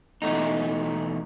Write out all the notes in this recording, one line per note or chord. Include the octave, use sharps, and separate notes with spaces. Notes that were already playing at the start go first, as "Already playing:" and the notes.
E2 B2 A3 D#4